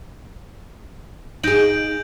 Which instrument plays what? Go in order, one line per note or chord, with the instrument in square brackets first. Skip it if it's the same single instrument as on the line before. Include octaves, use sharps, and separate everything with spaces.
[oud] D#4 G#4 [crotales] G6 D7 F#7